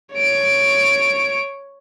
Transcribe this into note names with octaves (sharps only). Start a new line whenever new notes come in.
C#5 D7